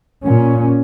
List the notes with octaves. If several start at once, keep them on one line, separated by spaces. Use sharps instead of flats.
A#2 C#4